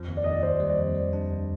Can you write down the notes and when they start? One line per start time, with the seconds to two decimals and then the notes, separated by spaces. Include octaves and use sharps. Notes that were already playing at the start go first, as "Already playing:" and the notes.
Already playing: F2 F3
0.08 D#2
0.17 D5
0.24 D#2 D#5
0.31 D5
0.43 D#3 C5
0.60 G3
0.70 D5
0.78 F2
0.95 G3
1.13 D4
1.30 D#2